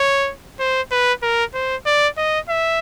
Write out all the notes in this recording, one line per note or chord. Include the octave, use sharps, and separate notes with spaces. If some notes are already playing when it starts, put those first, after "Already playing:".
Already playing: C#5
C5
B4
A#4
C5
D5
D#5
E5